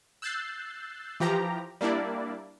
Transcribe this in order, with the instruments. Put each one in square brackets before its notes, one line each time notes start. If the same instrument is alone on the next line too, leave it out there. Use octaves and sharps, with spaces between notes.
[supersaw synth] E6 F#6 G6 A6 C7
E3 F3 G4 A#5
G3 A#3 D4 E4 D5